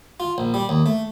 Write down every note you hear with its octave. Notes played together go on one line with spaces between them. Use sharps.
F4
A#1
G3
D#2
A3